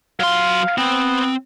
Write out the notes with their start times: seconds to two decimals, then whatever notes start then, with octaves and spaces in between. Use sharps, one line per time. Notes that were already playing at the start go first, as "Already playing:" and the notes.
0.20 F#3 F5 C6
0.78 B3 C4